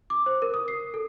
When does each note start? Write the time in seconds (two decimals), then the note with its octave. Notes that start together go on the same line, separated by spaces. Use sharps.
0.10 D6
0.26 C5
0.42 A#4
0.54 D#6
0.68 C7
0.94 A4